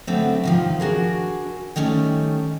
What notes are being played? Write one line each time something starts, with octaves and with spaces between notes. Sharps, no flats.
D3 F#3 A3 B3 C4
C3 D#3 F3
D4 F#4 G#4 A#4
D#3 G3 A3 C#4